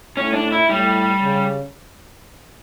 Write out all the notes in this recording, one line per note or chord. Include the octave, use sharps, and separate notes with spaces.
A2 C#4
D4
E4
A2 G3
C#3